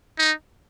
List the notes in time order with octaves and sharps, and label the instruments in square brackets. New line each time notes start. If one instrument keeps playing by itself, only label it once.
[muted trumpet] D#4